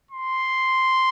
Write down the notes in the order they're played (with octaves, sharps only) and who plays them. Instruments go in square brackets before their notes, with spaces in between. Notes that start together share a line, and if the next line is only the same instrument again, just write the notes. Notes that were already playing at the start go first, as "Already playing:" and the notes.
[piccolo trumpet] C6